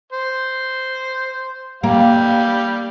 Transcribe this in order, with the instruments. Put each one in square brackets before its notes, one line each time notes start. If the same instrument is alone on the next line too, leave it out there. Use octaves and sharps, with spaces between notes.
[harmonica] C5
[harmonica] G3 F5 G5 [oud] A#3